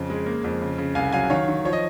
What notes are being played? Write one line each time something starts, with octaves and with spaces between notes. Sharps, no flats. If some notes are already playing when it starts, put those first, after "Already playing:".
Already playing: F2 C#3
G#3
A#3
F2
C#3
C#3
C2 F5 G#5
F#3 F5 G#5
D#3 C#5 F5
D#3
F3 C#5
D#5